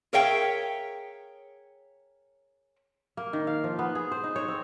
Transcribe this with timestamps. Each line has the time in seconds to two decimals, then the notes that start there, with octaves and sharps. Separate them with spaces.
0.13 G#4 A#4 C#5 E5 F5 G5
3.17 A#3
3.33 D#3
3.47 F5
3.64 F3
3.79 B3
3.95 G#4
4.12 C5
4.24 D#4
4.36 C#5
4.48 C4